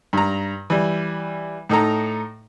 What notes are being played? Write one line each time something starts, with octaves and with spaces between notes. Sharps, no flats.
G2 A#5
E3 G3
A2 D#4 A4 A#5